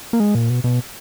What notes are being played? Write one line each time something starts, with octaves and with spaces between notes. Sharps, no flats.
A#3
G#3
A#2
B2
B2